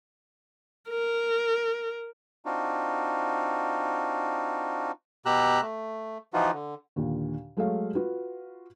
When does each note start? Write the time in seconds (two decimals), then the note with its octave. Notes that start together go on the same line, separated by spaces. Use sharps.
0.89 A#4
2.45 C4 D4 D#4 F4 F#4
5.26 B2 G4 A#5 E6 F#6
5.62 A3
6.34 E3 F3 D#4 F4 F#4
6.53 D3
6.96 D#2 A#2 D3
7.57 F#3 G#3 A3 A4 C#5 F5
7.95 F4 F#4 B4